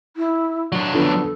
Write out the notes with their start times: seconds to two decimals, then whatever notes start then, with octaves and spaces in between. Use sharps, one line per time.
0.17 E4
0.72 F#3 D4
0.94 D3 F3 B3 A4